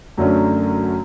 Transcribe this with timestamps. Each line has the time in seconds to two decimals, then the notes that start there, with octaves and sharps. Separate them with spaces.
0.18 F#2 D3 F#3 A3 C#4